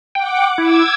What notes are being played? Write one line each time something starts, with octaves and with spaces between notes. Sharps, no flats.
F#5 G5 D6
E4 D6 E6 G#6